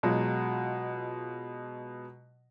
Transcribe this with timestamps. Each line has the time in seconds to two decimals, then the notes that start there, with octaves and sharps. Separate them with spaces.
0.03 B2 F#3 G#3 F4